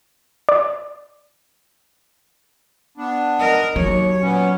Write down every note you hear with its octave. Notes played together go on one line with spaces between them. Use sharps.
D5
B3 D4
A#4 D#5
D#2 F#3 C#5
A#2 B3 C#4